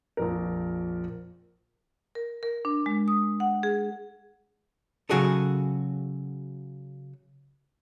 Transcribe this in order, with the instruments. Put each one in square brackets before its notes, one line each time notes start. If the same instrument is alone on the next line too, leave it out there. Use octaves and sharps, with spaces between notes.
[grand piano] A#1 F2 A#4
[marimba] A#4
A#4
D4
G#3
D#6
F#5
G#4
[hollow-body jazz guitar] C#3 F#3 F#4 G#4 A4